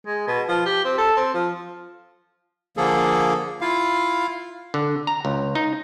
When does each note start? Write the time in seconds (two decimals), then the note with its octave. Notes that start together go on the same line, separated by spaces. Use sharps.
0.06 G#3
0.28 B2
0.48 F3
0.65 G4
0.85 C4
0.98 A4
1.17 C4
1.34 F3
2.77 D3 F3 A#3 G#4 A4
3.61 E4 F4 F5
4.74 D3
5.07 A#5
5.25 C#2
5.55 D#4